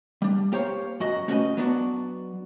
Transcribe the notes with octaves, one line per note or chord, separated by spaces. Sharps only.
G3 D4
A#3 G4 C5 C#5 F5
F#2 F#4 D#5
A3 C#4 F#4 A#4 B4 D#5
F#3 B3 D4 F#4